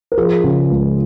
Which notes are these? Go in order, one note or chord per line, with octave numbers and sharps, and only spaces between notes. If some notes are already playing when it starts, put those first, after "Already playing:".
A#4
F3 G#4
C#3
C#2